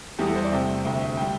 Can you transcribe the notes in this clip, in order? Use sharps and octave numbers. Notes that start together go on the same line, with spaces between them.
E2 E3 G3 G4
A4
C5
D5
C2 C3 A3 G5
D2 C3 A3 G5
E5
D3 G3 G5